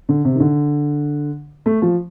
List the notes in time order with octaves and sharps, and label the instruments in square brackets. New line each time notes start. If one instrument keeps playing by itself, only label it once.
[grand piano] D3
C3
D#3
D3
A3
F3